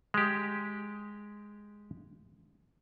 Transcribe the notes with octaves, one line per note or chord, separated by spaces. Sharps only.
G#3 G4